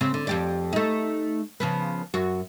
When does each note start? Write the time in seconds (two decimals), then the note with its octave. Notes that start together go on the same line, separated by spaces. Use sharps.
0.01 C#3 C4
0.14 D3
0.27 F2 G4 D5
0.73 A3 D#4
1.60 C#3 F3 B3
2.14 F#2 F#4